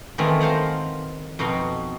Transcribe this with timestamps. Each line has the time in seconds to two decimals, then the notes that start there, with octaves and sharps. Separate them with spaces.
0.18 D#3 E3 G#3 A3 C4 F4
0.40 A#4 C5 F5 F#5
1.39 F2 B2 D#4 F#4